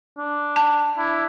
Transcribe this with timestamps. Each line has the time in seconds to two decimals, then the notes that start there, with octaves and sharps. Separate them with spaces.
0.18 D4
0.56 A5
0.98 D4 E4